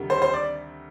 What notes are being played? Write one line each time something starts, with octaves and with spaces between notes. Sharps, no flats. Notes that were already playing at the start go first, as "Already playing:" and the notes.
Already playing: D2 C3 D#3 G3
C5
C5
D5